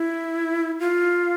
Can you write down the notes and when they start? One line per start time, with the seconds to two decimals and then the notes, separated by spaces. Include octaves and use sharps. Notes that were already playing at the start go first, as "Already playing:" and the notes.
Already playing: E4
0.80 F4